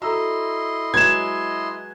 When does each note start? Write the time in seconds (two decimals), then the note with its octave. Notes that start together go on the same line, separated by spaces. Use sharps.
0.02 E4 F#4 A4 D#5 A#5 C6 E6
0.94 F#3 G#3 B4 G#6 E7